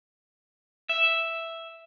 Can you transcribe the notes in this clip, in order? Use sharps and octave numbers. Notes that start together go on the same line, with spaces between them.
E5